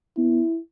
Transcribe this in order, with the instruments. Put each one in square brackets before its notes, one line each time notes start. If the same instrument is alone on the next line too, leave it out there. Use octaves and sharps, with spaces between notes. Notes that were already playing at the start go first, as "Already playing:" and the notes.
[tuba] B3 [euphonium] E4